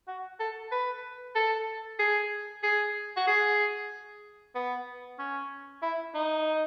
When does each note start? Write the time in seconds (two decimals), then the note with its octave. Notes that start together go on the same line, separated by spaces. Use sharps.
0.08 F#4
0.40 A4
0.72 B4
1.35 A4
1.99 G#4
2.63 G#4
3.16 F#4
3.27 G#4
4.55 B3
5.19 C#4
5.82 E4
6.15 D#4